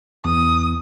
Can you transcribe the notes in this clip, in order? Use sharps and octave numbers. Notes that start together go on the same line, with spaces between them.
E2 D#6